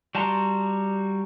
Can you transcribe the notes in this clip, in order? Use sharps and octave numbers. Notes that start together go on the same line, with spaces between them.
G3 F#4 A5 A#5 C6